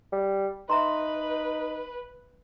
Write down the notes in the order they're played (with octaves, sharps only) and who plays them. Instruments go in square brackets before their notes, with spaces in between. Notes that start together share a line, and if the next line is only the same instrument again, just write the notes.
[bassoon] G3
[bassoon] D#4 [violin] B4 [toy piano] E5 A#5 C6